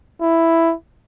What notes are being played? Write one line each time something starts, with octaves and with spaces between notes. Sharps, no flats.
E4